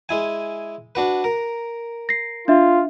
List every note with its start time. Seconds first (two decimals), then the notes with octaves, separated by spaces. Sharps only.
0.09 G#3 E4 G#5
0.95 D4 F#4 B4
1.24 A#4
2.09 A#6 C7
2.48 D4 F4 E5